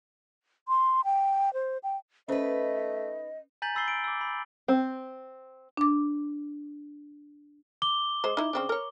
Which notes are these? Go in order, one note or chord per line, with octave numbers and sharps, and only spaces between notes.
C6
G5
C5
G5
A3 C#4 D#4 B4 C5 D#5
G#5 A#5 G6 A6 B6 F#7
B5 E6 A6 C7 G7
D7
D6 E6
B5
C4
D4 D6
D6 G7
G#3 C5
D#4 E4
C#3 C4 D4
A#4 C#5